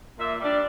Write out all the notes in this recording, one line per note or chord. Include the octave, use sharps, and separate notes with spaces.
A#2 E5
G3 D4